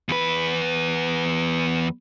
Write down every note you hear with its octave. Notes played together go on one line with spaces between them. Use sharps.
E2 B4